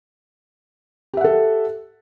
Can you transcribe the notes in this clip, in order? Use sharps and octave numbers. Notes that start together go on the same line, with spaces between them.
G4 A4 E5 F#5